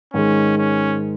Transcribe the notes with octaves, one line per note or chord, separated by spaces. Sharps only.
G#2 D#3 G#3 C#4
C#4